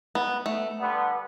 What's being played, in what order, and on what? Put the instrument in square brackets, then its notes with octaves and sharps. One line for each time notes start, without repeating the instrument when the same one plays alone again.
[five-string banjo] B3
A3
[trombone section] D3 G3 B3